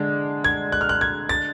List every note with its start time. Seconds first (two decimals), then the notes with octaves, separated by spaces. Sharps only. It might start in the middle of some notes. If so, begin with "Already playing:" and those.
Already playing: D3 G#3 D4
0.44 G#6
0.72 F#6
0.81 F6
0.89 F#6
1.01 G#6
1.29 A6